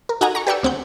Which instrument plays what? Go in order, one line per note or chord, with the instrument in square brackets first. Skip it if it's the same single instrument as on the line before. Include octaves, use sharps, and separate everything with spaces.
[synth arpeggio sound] A#4
D#4 F#4 A4 F#5 G#5 A#5
A#5 C#6
G4 B4 D5 G5 C#6 E6
D2 C4 F#5 G6